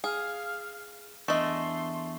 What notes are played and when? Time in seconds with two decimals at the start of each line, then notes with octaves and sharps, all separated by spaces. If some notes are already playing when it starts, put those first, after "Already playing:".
0.04 G#4 F5
1.28 E2 A3 D4 D#5 E5 C6 C#6